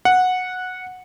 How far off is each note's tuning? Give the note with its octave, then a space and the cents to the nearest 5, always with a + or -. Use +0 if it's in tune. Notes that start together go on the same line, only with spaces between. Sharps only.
F#5 -10